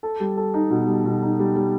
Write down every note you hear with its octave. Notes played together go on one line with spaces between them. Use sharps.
A4
G3
A4
D#4
B2
G3
B2
D#4
G3
G3